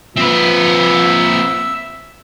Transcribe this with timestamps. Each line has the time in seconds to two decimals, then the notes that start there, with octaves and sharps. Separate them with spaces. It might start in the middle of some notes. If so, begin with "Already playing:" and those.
0.16 F3 C4 B4 E5 E6